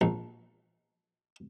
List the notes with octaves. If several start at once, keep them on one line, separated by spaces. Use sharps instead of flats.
A#1